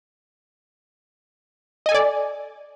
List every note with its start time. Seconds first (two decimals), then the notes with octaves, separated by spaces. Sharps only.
1.86 D#5
1.89 G#5
1.92 A4
1.94 D5